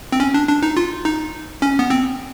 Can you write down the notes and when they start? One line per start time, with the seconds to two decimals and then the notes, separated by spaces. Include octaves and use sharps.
0.12 C4
0.20 C#4
0.34 D4
0.48 D4
0.63 D#4
0.77 F4
1.05 D#4
1.62 C#4
1.79 B3
1.90 C4